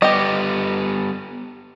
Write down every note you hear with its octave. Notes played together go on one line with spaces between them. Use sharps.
G3 B3 G4 D#5